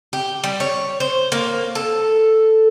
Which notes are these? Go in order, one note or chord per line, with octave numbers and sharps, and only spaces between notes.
G4
G3
C#5
C5
A#3
A4